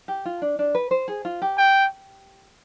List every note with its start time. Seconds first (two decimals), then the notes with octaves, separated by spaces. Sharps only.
0.08 G4
0.25 F4
0.42 D4
0.59 D4
0.75 B4
0.91 C5
1.08 G#4
1.25 F4
1.42 G4
1.58 G5